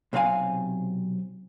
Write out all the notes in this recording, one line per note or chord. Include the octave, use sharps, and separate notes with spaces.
B1 C3 C4 F5 G#5